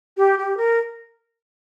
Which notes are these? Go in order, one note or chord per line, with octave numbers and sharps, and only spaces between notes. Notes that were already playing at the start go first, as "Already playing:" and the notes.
G4
G4
A#4